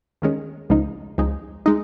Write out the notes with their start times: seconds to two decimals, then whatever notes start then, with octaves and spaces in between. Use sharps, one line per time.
0.22 D#2 D#3 G#3 C#4
0.69 C#2 C#3 F3 G#3 D#4
1.18 C#2 C#3 F3 G#3 D#4
1.66 G#3 D#4